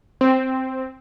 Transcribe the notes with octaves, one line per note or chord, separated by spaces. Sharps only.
C4